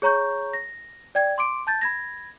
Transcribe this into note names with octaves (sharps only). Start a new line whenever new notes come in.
G#4 C#5 A#5 C#6 G6
A#6
D5 G5 G#6
C6 D6 D7
A5 G6 A6
B5 G#6 A#6